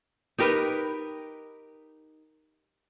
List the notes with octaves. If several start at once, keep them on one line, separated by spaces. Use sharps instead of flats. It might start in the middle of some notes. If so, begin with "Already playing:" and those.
D#4 G4 A#4 B4